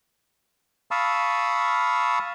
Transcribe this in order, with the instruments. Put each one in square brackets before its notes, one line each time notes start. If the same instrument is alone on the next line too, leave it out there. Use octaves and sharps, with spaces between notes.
[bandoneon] F5 A5 B5 C#6 D#6 E6